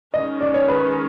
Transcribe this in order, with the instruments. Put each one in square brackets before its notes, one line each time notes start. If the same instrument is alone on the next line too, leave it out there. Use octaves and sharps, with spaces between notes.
[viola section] D#3 G#3 C#4 [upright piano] D#5
[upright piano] D5
C#5
B4